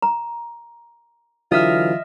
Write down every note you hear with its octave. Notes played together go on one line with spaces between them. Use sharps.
A#5
D3 E3 F#3 F4 D#5 E5 F6